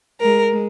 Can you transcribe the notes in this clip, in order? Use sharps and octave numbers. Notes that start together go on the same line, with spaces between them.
G#3 A#4